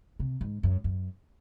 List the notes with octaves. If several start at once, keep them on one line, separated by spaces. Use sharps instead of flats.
C3
G#2
F#2
F#2